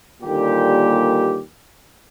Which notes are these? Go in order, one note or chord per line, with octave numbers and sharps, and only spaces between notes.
D#2 A#2 D3 G3 G4